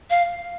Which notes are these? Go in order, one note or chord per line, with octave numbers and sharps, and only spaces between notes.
F5